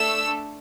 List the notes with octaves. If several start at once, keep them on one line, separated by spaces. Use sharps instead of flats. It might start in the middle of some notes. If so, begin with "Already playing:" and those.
Already playing: A3 D4 A4 E6